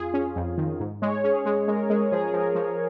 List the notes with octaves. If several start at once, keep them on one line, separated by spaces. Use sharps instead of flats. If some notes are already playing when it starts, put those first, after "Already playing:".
Already playing: F2 F4 G#4
C#4
F2
D#3
G#2
G#3 C#5
C#4 G#4
G#3
G#3 A#4
G#3 G#4
F3 G#4
F3 A#4
F3